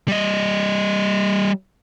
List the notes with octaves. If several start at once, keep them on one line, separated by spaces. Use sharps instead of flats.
G3 D#5